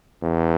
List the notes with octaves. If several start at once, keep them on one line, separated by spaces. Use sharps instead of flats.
E2